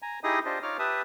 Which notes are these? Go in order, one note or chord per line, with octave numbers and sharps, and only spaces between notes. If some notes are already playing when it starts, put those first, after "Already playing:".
G#5 A#5
D#4 E4 G4 G#4 D#5 D#6
D4 F4 G4 C5 D#5
D#4 F4 C#5 D6 F6
G4 B4 E5 A5 D#6